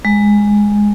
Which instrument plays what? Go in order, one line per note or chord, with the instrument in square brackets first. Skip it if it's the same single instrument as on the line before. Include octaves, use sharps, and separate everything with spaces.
[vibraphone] G#3